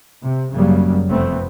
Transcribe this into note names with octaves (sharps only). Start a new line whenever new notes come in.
C3
G#1 F#2 C#3 F#3 G3 A#3
F1 F2 A3 B3 C4